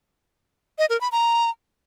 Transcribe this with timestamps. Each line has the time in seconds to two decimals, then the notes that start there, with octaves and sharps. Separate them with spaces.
0.79 D#5
0.90 A#4
1.01 B5
1.12 A#5